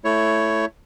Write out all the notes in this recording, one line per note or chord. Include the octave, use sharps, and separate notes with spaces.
A3 E4 C#5